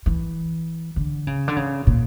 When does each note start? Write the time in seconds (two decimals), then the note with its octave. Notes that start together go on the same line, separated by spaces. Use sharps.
0.06 E3
0.96 D3
1.27 C#3
1.48 D3
1.56 C#3
1.87 A#2